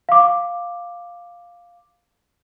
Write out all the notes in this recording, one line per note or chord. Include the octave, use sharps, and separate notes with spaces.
F5 D6